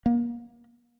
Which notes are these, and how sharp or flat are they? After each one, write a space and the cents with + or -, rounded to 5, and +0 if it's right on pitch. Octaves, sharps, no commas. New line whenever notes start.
A#3 +35